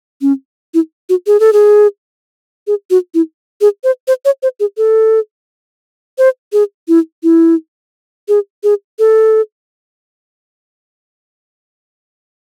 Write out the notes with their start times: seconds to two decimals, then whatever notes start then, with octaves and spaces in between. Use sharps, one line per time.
0.22 C#4
0.74 E4
1.09 F#4
1.27 G#4
1.40 A4
1.53 G#4
2.67 G#4
2.90 F#4
3.14 E4
3.61 G#4
3.84 C5
4.08 C5
4.25 C#5
4.43 C5
4.60 G#4
4.77 A4
6.18 C5
6.53 G#4
6.88 E4
7.23 E4
8.28 G#4
8.64 G#4
8.99 A4